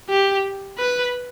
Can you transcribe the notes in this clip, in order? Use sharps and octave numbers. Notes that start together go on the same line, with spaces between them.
G4
B4